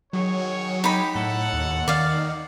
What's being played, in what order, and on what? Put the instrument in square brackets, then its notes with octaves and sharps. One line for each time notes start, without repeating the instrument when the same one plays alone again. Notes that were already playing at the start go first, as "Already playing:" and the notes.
[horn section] D#3 G#4 C#5 [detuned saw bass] F#3
[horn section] G#3 G4 [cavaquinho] D#4 B5
[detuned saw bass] A2 [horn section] A4 C#5 F#5
[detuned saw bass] D#2
[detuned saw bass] D#3 [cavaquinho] D5 F5